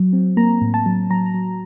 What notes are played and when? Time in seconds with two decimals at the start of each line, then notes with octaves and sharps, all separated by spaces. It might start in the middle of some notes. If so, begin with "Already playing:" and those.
Already playing: F#3
0.13 C4
0.37 A#3 A#5
0.62 A2
0.74 A5
0.86 F#3
1.10 F#3 A#5
1.26 A#5
1.34 F#3